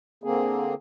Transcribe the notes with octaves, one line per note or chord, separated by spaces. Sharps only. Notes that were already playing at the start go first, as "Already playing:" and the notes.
D3 A#3 C4 G#4